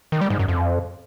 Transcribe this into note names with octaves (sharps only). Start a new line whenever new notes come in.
D#3
G3
G#2
F#2
F2